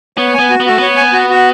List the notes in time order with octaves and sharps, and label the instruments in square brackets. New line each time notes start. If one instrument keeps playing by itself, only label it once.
[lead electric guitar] B3 [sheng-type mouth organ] C#5
[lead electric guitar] B3 [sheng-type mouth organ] G#5
[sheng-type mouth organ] F#4
[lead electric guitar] B3
[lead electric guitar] A3 [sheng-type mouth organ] F#4
[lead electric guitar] B3 [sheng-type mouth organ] C#5
[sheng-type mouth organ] G#5
F#4
F#4